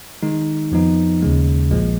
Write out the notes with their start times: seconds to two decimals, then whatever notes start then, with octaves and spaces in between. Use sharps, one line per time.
0.23 D#3 G#3 D#4
0.72 F2 F3 B3 D#4
1.22 D#2 C#3 G#3
1.71 A#1 A#2 F3 G#3